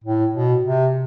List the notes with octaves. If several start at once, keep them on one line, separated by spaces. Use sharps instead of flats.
A2
B2
C3